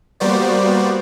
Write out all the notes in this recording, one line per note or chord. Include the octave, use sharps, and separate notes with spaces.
G3 A#3 B3 F#4 C5 D5